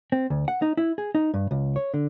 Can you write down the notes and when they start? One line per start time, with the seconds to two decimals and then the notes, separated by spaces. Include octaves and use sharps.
0.12 C4
0.30 D2
0.48 F#5
0.62 D#4
0.77 E4
0.98 G#4
1.15 D#4
1.34 G2
1.51 C#2
1.76 C#5
1.94 D3